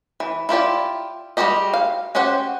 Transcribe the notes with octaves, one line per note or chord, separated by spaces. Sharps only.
E3
E4 F4 G4 D5
G3 G#3 F#4 G4 D#5
F5
C#4 F#4 G4 C5 F#5